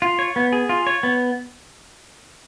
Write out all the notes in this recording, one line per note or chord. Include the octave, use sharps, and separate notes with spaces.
F4
C#5
B3
G#4
F4
C#5
B3